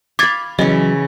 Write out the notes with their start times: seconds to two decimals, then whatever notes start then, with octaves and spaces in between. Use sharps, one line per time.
0.19 F5 B5 D6 G#6 A6
0.59 C#3 E3 F#3 C#4 D#5